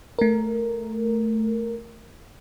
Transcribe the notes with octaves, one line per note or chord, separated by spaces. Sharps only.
A3 A#4